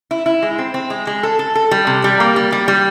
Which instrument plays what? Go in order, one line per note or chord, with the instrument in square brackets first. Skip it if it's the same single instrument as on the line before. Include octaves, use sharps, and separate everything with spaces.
[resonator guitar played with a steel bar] E4
E4
G#3
C4
C4
G#3
G#3
A4
A4
A4
G3
C3
G3
A#3
G3
G3
G3